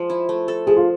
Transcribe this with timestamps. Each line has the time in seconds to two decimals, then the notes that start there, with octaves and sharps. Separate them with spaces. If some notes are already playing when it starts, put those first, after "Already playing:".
Already playing: F3 G#3
0.10 E4
0.29 A3
0.48 A4
0.67 F3 G#4
0.77 F4